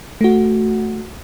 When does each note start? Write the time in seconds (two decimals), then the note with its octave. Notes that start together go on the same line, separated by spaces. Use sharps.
0.21 A3 F#4